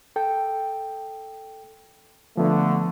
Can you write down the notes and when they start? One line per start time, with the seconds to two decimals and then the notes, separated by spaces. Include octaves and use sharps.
0.16 A4 G5
2.37 D3 F3 A3 B3